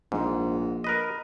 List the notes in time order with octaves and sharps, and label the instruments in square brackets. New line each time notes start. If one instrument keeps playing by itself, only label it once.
[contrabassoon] A#1 [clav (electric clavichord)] G#2
[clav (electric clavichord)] A#4 B4 D#5